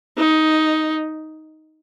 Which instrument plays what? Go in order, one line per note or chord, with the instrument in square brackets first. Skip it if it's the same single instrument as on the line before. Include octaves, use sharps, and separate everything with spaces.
[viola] D#4